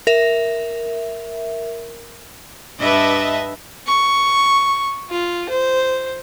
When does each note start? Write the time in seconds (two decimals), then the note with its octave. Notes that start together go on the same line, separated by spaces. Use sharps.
0.07 A#4 E5
2.79 G2 B4 D#5 E5 A5
3.87 C#6
5.10 F4
5.49 C5